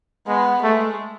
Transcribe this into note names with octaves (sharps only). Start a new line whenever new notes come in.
G#3 B3
G#3 A3